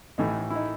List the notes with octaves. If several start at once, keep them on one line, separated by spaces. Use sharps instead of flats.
A1 A2 E3 D#4
E4
D#4